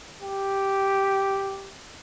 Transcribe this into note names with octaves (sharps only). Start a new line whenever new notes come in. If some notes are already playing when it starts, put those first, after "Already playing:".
G4